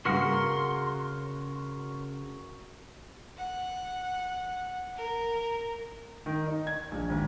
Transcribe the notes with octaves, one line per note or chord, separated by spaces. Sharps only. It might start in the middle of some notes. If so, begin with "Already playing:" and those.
C#3 A#3 F#4 G#4 A#4 F#5 C6
F#5
A#4
D#3
D#4
G#6
A#1
G#1